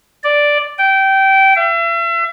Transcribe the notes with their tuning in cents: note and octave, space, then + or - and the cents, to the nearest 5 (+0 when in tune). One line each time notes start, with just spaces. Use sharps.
D5 +0
G5 -20
E5 +40